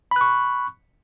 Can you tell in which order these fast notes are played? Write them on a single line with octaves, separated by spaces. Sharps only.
B5 F#6 C#6